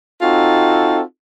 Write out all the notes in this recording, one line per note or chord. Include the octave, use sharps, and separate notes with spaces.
C4 D#4 F4 F#4 A4